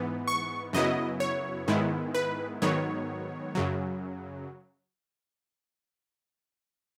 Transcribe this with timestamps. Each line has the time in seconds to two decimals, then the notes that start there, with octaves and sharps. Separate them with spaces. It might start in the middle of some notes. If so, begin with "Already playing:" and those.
Already playing: G#2 E3 B3
0.28 C#6
0.73 F#2 C#3 F#3 B3 E4 D#5
1.20 C#5
1.68 G#2 D#3 G#3 B3 E4
2.15 B4
2.62 G#2 D#3 F#3 B3 C#5
3.55 F#2 C#3 F#3